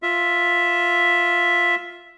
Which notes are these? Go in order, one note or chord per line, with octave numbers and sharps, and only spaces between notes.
F4 E5